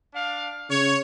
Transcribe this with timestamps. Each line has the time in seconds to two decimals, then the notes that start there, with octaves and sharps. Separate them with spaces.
0.14 D4 F5
0.70 C#3 C#5